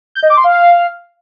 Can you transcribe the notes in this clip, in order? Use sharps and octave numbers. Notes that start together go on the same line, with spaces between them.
G6
D#5
D6
C6
F5